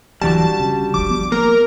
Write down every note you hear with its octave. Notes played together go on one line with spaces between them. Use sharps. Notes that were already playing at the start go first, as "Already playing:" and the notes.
D1 E3 F#3 G3 D4 F#4 A5
C#3
D#1 G#1 F3 D6
F3 B3
A#3 A#4